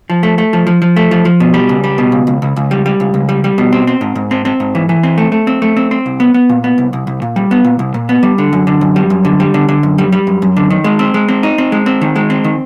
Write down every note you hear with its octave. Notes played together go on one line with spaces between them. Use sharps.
F3
A3
A3
F3
F3
F3
A3
F3
F3
B2
G3
C#2
G3
B2
C#2
C#2
C#2
C#2
G3
G3
C#2
C#2
G3
G3
B2
C4
C4
G#2
G#2
C4
C4
G#2
E3
E3
C4
A3
A3
C4
A3
C4
C4
C2
B3
B3
A#2
B3
C2
C2
C2
A#2
G3
B3
A#2
C2
A#2
B3
G3
D3
F#2
D3
F#2
G3
F#2
D3
G3
D3
D3
F#2
G3
G3
F#2
F#2
D3
D#3
G#3
C4
G#3
C4
D#4
C4
G#3
C4
D#3
G#3
C4
D#3